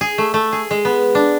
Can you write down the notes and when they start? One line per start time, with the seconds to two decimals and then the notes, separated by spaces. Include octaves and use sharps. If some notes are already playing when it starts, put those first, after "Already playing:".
0.01 G#4
0.18 A3
0.34 A3
0.53 G#4
0.71 G#3
0.85 B3
1.15 D4